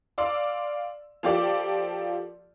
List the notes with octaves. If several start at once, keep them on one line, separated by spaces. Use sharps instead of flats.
D5 F5 C6 E6
F3 A#3 F4 G4 A4 D5